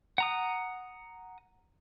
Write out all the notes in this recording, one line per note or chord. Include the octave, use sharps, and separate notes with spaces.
F#5 A#5 D#6